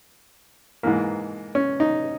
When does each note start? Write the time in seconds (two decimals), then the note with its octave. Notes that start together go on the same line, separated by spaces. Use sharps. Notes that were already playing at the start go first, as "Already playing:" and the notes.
0.83 G#2 E3 A#3
1.55 C#4
1.80 D#4